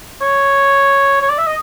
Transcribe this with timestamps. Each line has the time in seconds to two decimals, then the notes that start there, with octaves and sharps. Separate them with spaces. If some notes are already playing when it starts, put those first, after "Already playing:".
0.21 C#5
1.22 C#5
1.30 D5
1.38 E5
1.47 D#5